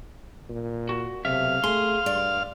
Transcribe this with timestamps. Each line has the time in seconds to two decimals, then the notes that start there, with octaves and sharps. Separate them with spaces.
0.49 A#2
0.89 F#4
1.25 B1 C3 E5 F5
1.64 A3 G#4 C6
2.06 G2 D5